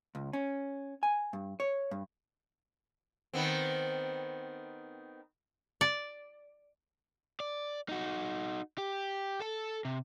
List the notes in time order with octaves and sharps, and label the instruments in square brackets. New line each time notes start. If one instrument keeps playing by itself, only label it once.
[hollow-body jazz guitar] C#2
C#4
G#5
G2
C#5
G2
[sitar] D#3 B3 C4
[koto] D5
[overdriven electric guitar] D5
D#4 F#4
G4
A4 A5
C3